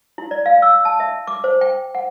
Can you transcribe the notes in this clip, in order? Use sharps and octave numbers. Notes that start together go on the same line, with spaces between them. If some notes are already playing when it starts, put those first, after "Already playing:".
E4
D5
F5
E6
A5
E5
D6
C5
G5
F#5